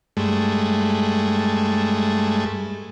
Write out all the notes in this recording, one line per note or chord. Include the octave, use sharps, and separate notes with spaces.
G2 G#3 A3